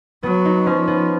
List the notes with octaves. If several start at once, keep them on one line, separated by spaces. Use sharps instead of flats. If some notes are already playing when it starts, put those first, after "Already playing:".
F#3 B3
D#4
F3 C#4
B3